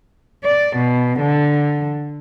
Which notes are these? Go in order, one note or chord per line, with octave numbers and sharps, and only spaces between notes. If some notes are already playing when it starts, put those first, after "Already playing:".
D5
B2
D3